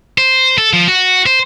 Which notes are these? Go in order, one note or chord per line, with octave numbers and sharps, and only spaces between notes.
C5
A4
F3
F#4
C5